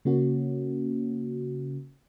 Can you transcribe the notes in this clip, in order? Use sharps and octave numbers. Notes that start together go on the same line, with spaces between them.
C#3 A#3 C#4 F#4